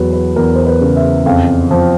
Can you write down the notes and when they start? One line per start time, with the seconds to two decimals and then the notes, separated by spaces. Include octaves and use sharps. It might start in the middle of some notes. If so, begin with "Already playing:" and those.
Already playing: E2 F#3 B4
0.13 B4
0.36 E2 A#4
0.55 C5
0.67 B4
0.81 C#3
0.96 E5
1.26 F2 F5
1.71 F3